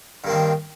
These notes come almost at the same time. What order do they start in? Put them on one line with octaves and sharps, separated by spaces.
G2 A#3 C4 D#3